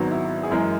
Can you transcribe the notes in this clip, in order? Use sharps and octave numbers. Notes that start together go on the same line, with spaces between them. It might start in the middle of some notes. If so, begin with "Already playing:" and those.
Already playing: G#1 G#2 F#3 B3 F#4
E4
G#4
F#2 E3 G#3 A#4